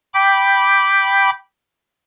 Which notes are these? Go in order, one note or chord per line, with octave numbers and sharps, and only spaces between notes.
G5 B5 D6